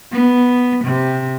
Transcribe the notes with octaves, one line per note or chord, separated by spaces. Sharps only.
B3
C3